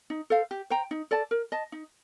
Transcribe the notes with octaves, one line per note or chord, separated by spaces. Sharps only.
D#4
A4 C5 F5
G4
C5 G5 A#5
D#4
A4 D5 A5
A#4
D#5 A5
D#4